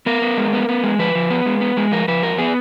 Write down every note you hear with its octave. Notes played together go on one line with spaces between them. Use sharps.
B3 A#4
B3
G#3
B3
B3
G#3
F3 B4
F3
B3
G#3
B3
G#3
F3 A#4
F3 B4
F2 A#4
B3 G#4